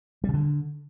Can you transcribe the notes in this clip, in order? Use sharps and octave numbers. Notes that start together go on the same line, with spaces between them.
G3
C#3
D3